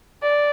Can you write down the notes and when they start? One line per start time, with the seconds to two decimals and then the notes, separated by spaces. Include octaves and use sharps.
0.23 D5